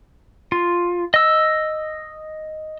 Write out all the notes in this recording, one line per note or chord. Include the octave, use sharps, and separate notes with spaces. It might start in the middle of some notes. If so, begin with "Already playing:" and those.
F4
D#5 E6